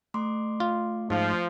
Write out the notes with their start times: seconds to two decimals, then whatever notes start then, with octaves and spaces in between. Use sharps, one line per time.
0.14 A3 C6 D6
0.60 F4
1.10 G#2 F3